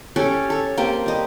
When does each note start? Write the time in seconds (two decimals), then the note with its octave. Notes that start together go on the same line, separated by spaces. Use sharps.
0.16 C#4 G4 A4 C#5
0.50 A4 C#5
0.78 A#3 C4 G4 G5
1.06 G3 D#5